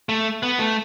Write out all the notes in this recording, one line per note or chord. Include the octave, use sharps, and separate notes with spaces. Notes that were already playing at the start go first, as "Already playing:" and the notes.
A3
B3
A3